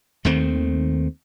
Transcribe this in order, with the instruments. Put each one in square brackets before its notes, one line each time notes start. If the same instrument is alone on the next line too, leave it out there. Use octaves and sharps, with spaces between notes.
[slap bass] D#2 D#3 A3 C4